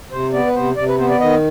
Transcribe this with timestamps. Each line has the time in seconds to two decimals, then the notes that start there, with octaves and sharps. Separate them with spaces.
0.12 C3 C5
0.33 B3 D5
0.46 B4
0.55 C3 C5
0.77 C3 D5
0.88 B4
0.98 B3 C5
1.09 D5
1.20 D#3 D#5